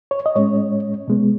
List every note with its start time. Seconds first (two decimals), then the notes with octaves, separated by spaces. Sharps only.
0.11 C#5
0.26 D#5
0.35 A2 G#3 C#4 C#5
1.08 B2 G#3 B3